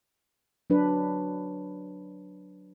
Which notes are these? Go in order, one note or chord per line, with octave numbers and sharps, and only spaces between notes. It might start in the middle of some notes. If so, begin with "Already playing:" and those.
F#3 D4 B4